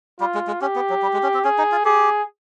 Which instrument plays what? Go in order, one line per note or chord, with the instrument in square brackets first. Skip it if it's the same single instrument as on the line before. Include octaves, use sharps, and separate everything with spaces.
[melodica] G3 [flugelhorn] F4
[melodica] G#3
G#3
[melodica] C#4 [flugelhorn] G4
[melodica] B3
F#3
G3
G#3
C#4
C4
[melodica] C#4 [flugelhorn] G#4
[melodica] D#4
F4
[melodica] G4 [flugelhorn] G#4